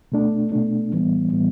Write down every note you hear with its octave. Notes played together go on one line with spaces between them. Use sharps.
B2 A3 D4
B2 A3 D4
A2 E3 G3 B3
A2 E3 G3 B3